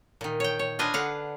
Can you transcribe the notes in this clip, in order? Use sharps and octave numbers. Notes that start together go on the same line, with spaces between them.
A#2 D#3
C#5 G5
C#5
D4 F4 B4 D#5 G#5
D3 F5 F#5